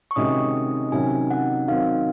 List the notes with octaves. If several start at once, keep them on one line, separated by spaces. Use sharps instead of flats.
C#6
C3 D#3 G#3 C#4 F#4 D#6
C3 D#3 F#3 C#4 G#5
F#5
D#3 F#3 C4 F5